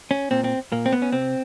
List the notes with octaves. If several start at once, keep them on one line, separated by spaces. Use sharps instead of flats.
C#4
A#2 C4
C4
A#2 A#3
C4
B3
C#4
C3 C4